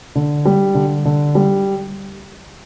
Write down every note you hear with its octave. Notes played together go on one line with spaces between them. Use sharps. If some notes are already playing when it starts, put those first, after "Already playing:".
D3
G3
D3
D3
G3